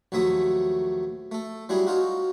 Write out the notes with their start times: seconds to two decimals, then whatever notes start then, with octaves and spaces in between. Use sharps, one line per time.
0.12 A#1 D#2 F#3 A3 E5 D#6
1.32 A3 A4
1.69 F#3 G3 D4 E4 G#4
1.87 C#4 D#4 F4 F#4